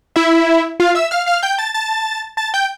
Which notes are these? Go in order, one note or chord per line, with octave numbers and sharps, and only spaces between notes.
E4 E5
F4 F5
E5 E6
F5 F6
F5 F6
G5 G6
A5 A6
A5 A6
A5 A6
G5 G6